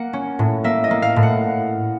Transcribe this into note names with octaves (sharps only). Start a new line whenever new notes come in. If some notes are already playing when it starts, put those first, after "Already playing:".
Already playing: A#3 F#5
C#4
A2
A#3 E5
D#5
A#3
F5
A2
F#5